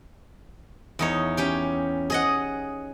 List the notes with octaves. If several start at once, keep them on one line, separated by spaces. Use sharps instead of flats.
E2 D#4 C#5
C#4 G4 G5
G#4 D#5 F#5